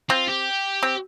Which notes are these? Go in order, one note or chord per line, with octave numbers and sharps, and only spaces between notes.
C4 F4
G4
C4